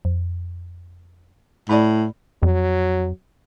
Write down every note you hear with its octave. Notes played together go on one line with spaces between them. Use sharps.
F2
A2 D5 B5
F2 F#3